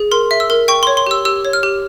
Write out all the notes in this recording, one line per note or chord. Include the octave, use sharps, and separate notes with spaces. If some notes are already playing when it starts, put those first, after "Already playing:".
Already playing: G#4
A#4 C6
E5
E6
A#4
G5 C#6
C#5 C6
C6
G4 E6
G4 E6
C#5
F6
G4